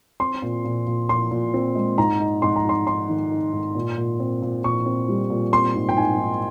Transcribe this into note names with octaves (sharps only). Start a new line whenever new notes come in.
C4 C6
A#2
A#2
A#2
A#2 C6
A#2
C4
G#3
G#2 A#5
D#4
G#2 C6
A#5
D#4 C6
D#4 C6
D#3
D#4
G#2
A#2
A#2
C4
A#2
A#2 C#6
C4
G3
A#2
C4 C6
G#2
G5
G#2 G#5
D#4